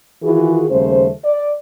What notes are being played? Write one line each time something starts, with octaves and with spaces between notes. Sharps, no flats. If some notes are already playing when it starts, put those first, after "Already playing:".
D#3 E3 F4 F#4 G#4
D#2 C#3 G3 A3 C5
D5